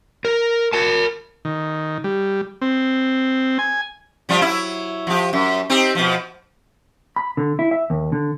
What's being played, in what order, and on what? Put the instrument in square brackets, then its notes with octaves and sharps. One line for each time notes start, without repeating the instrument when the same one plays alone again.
[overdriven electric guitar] A#4
A#4 A5
[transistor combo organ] D#3
G3
C4
G#5
[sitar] F3 G3 F4
F#3 E4
F3 G4
F#2
C4 D#4 G4
B2 F3
[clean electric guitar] B5
D3
E4
E5
D#2
D3